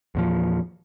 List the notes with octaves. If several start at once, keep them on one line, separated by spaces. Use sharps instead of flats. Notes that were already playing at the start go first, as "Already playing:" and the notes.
E2 A#2 F3